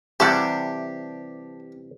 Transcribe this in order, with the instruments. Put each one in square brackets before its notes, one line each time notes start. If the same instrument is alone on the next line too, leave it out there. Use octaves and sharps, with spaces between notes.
[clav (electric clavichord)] C3 E3 G3 [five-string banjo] D4 A4 F#5 [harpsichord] G4